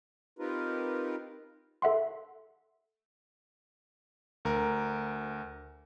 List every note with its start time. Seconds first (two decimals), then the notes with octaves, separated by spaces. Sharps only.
0.39 C4 D#4 F4 G4 A#4 B4
1.82 A4 E5 F#5 C6
4.45 D2 A#4